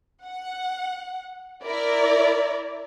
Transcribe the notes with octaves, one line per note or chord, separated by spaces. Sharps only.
F#5
E4 A#4 D5